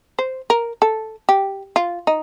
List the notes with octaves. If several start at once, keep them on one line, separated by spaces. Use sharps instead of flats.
C5
A#4
A4
G4
F4
D#4